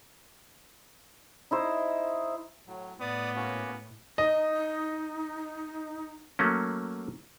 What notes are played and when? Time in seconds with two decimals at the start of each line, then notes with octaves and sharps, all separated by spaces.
1.51 D#4 E4 C5
2.67 A2 F#3
3.01 A2 B3 D5 D6 D#6
3.36 A#3 C#4 F#4
4.18 D#4 D#5
6.39 F#3 A3 A#3 C#4